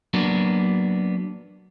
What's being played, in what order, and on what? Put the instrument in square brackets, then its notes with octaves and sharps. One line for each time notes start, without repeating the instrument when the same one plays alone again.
[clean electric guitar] F#3 A#3 B3 D4